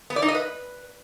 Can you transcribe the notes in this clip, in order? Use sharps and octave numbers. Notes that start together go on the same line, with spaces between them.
B3
D5
D#4
D#5
B4